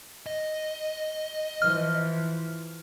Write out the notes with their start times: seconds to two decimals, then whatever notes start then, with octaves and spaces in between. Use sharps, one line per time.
0.26 D#5
1.62 E3 F3 F6